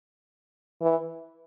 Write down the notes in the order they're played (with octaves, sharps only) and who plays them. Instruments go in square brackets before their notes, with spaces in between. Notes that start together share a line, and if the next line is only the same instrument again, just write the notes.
[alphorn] E3